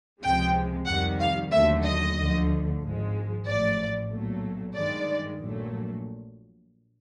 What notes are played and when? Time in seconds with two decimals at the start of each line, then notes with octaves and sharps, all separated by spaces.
0.22 C#2 C3 F3 G#3 G5
0.87 F2 C3 D#3 G3 F#5
1.20 F5
1.52 D#2 D3 F#3 A3 E5
1.85 D#5
2.17 D2 D3 F3 A3
2.81 G#1 G#2 F3 G#3
3.46 A1 A2 F3 D5
4.11 B1 A#2 F#3 A3
4.75 G2 D#3 G#3 D5
5.40 A#1 A#2 F#3 A3